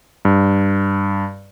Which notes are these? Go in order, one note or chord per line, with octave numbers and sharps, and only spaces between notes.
G2